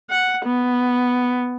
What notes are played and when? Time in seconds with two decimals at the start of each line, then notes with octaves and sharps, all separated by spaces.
0.11 F#5
0.45 B3